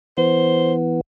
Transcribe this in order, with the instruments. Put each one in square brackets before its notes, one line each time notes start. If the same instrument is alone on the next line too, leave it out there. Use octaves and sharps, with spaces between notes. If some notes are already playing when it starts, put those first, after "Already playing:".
[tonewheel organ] E3 B3 [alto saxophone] C5